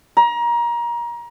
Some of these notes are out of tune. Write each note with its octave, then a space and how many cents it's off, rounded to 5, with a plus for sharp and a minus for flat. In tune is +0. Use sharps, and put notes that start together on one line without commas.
A#5 +25